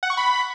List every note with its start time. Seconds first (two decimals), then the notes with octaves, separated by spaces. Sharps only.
0.03 F#5
0.10 C#6
0.17 B5